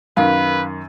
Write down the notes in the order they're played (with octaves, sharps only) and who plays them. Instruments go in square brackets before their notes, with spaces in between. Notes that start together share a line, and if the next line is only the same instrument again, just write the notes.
[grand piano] F#2 D#3 [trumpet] B4 [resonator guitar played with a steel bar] F5